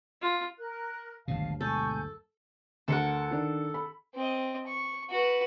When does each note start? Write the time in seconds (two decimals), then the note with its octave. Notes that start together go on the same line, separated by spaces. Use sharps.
0.22 F4
0.58 A#4 F#6
1.28 G#1 D2 G2 B2 F#3 F5 A5
1.61 B2 G#3 A4 G#5 C#6 G6
2.88 D2 A4 A#4 F#5 C#7
3.31 D#3 D4
3.74 B5
4.15 C4 D#5
4.67 C#6
5.10 F#4 B4